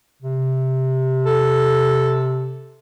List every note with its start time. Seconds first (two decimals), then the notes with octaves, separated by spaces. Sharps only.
0.23 C3
1.26 A4